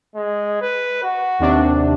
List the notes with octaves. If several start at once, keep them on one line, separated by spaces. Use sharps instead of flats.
G#3
B4
F#4
D#2 C3 D4